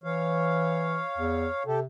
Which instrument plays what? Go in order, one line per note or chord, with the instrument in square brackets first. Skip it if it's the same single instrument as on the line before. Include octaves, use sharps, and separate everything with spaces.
[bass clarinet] E3 [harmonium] C#5 F5
[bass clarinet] E2
[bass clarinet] C3 [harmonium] G4 A4